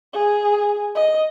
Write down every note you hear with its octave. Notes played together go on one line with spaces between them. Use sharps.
G#4
D#5